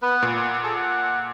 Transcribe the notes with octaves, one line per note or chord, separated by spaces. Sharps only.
B3 B4
A#2
F#5
G#4 A4
F#5